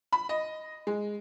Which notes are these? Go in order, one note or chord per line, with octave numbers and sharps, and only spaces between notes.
B5
D#5
G#3